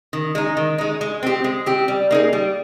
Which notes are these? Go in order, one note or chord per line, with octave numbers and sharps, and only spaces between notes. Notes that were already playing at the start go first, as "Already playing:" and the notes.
D#3
G#3 D#4
D#3
G#3 D#4
G#3
C4 G4
G#3
C4 G4
G3
A#3 D#4 G#4
G3